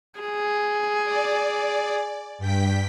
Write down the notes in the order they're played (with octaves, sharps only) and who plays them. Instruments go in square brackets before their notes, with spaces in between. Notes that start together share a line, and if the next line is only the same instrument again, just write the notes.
[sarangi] G#4
[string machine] D5
G2 G5 B6